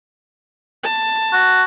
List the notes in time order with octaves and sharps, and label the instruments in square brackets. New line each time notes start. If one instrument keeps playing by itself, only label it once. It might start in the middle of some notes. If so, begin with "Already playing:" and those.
[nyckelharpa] A5
[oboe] F#4